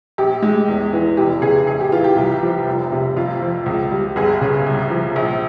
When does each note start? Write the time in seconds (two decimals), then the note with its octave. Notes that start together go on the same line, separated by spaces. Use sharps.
0.18 A#1 G4
0.42 G#3
0.68 E2
0.93 E3
1.17 F1 G4
1.42 C#3 G#4
1.67 A#1 G#4
1.80 G4
1.92 E3 F4
2.04 G4
2.17 C2
2.43 F3
2.67 F1
2.92 C3
3.17 F2 F4
3.42 F3
3.66 C#2
3.92 G3
4.16 G1 G#4
4.41 C#3
4.67 C2
4.90 F3
5.16 A#1